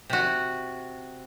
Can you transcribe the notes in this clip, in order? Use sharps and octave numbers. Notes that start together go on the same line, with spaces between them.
C3 F#4